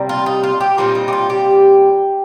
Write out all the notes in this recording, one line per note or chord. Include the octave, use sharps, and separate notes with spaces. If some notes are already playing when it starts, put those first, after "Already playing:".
Already playing: C3 G3 A#3
F4
D#4
F4
G4
A#2 G3 C4 D#4 F4
D#4
G4
F4
G4